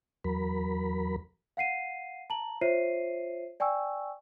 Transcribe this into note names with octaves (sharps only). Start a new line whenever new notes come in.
E2 F#3 A#4 B5
F5 F#5 C7 D#7
A5 A#5 F#7
F4 C5 C#5 E5 C7 D#7
D5 G5 G#5 C#6 E6